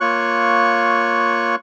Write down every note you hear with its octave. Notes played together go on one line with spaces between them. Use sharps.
A#3 F4 C#5 C#6 F#6